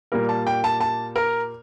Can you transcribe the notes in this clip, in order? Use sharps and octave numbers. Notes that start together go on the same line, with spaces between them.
A#2 G3 A#3 A#4
A5
G5
A5
A5
A#4